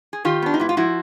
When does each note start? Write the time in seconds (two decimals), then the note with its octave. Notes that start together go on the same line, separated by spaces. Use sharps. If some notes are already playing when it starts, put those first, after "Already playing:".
0.13 G#4
0.25 D#3 F4 G4
0.42 B3 D4
0.54 D#4
0.60 G#2 E4
0.69 F4
0.77 F3 E4 F#4